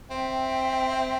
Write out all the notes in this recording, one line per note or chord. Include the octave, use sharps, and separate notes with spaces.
C4 E5 G5